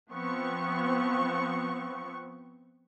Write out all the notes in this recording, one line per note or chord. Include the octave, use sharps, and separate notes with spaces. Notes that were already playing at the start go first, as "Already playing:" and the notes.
F3 B3 C4 C#6